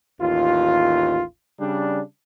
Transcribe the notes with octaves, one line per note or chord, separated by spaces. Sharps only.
A1 D#2 F4
C#3 G3 D4